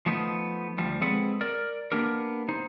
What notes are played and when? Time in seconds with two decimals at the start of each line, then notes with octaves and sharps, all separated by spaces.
0.06 F3 A3 B3 D#4
0.78 D2 F3 G3
1.01 G#3 C4 G#4 A4 B4 F#5
1.41 A#4 D5
1.92 A#3 B3 D4 G4 A#4
2.49 D#4 C5